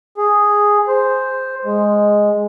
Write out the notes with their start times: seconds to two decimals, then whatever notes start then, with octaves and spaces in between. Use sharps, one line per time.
0.17 G#4
0.88 C5
1.65 G#3